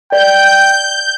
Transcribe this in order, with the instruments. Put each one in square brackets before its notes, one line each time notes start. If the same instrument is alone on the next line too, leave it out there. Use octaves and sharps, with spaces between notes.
[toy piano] D5 [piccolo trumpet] G5 [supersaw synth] G6